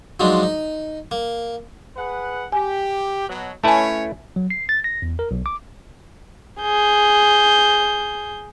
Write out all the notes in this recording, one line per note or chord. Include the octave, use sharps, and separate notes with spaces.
F3 F#3 G#3 D4 D#4
D#4
A#3
G#4 B4 F#5
G4 G#5
B2 F#3
A3 C#4 E4 B4 C#5 G#5 A5
F#3
C7
A6
A#6
E2
A#4
B1
D6
G#4 G6